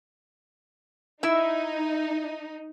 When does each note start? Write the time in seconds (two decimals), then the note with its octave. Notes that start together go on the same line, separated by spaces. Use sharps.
1.23 D#4 E4 E5